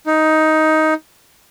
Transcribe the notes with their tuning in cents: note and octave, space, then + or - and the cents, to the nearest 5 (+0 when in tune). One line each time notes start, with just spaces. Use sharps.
D#4 +10